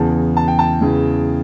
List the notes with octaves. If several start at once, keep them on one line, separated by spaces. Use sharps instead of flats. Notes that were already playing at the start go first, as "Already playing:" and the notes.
Already playing: E2 C#3 E3 A5
A5
G5
A5
E2 C#3 E3